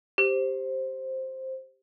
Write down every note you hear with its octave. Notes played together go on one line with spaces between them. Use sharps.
G4 C5